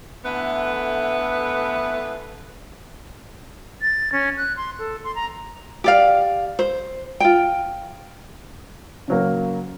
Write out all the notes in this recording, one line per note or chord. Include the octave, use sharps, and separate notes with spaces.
D3 E3 A3 B3 B4
A6
C#4
F#6
C6
A4
C6
A#5
G4 D5 F5
C5
F4 G5
C#3 F#3 A#3